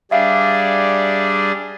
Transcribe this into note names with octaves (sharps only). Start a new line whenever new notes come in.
G3 D4 G#4 E5 F5 C7